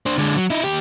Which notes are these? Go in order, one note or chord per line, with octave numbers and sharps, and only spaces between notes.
D4 C5
D3 G#3
F#3
D#4 E4
D#2 G4